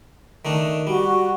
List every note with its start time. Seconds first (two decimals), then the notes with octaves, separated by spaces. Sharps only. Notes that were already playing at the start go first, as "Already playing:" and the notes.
0.45 D#3 A3 D4
0.87 G3 F#4